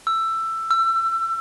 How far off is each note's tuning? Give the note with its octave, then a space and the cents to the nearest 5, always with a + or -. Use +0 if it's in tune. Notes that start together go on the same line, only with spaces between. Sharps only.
E6 +15
E6 +30